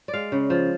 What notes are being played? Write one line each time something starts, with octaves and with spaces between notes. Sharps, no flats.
D5
G#3 F5
C#3
F3